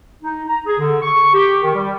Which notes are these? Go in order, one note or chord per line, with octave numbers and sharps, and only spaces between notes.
D#4
A#5
G#4
D3
C#6
G4
D#3
G3